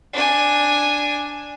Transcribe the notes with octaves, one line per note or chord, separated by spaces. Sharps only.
D4 G#5